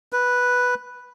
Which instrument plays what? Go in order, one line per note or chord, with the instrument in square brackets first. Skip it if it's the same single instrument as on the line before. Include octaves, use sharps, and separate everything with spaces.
[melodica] B4